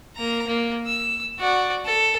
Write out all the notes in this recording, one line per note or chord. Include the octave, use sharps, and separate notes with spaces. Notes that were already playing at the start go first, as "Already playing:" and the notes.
A#3 A#5
A#3
E6
F#4 D5
A4